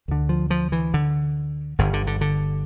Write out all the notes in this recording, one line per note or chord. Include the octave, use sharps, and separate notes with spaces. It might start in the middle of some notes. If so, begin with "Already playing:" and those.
D2 D3
F3
F3
E3
D3
G1 G2 D3
D3
D3
D3